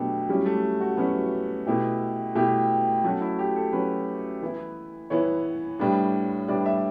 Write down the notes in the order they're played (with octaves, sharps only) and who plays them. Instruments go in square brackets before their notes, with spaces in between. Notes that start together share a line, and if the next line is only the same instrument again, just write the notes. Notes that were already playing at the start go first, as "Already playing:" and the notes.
Already playing: [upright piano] B2 F#3 B3 D4 G4 [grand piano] A3
[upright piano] F#3 C#4 E4 [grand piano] G3
[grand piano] A3
F#4
[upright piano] F#3 C#4 E4 [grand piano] B3
[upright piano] B2 A3 E4 G4
B2 A3 E4 G4
[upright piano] F#3 C#4 F#4 [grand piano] A3
[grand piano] E4
G4
A4
[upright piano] F#3 C#4 F#4 [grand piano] B4
[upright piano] E3 B3 E4
[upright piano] E3 B3 E4 [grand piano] C#5
[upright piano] A2 G3 B3 D4
[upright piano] A2 G3 B3 D4 [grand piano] D5
[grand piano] E5